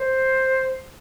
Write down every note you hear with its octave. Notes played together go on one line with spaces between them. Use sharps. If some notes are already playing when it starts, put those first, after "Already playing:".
Already playing: C5